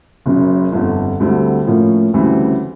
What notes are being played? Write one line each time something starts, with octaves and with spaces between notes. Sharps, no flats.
F#1 F#2 C#3
G1 F2 D3
D2 D3 G3 C4
A2 F3 A#3 C#4
D2 C#3 E3 G3 C4